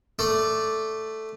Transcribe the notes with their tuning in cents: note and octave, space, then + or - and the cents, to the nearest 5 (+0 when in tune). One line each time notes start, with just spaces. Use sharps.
A3 +0 D5 +0